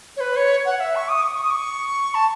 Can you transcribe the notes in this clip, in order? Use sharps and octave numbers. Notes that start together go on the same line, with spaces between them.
C#5
B4
C#5
F#5
F#5
E5
C#6
D#6
C#6
C#6
D#6
C#6
A5